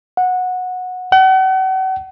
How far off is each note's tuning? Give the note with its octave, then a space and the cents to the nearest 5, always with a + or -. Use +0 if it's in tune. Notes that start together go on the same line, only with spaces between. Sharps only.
F#5 -15
F#5 +40